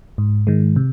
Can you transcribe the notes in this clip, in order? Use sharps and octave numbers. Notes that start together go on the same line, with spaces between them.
G#2
D#3 G#3
C3